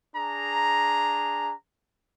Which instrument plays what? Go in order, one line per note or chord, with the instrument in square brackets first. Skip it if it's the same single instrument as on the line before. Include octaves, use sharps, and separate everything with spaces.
[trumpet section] D4 G#4 A#5